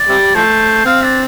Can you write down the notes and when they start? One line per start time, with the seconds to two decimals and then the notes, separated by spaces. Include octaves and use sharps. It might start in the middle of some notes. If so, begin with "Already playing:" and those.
Already playing: D5
0.09 C3 G3
0.35 F3 A3 C5
0.85 C4 F5
1.02 D4